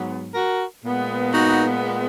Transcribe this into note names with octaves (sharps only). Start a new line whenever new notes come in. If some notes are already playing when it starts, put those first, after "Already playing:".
Already playing: G#2 F#3 B3
F#4 A#4
A#2 G#3 B3
D#4 F#4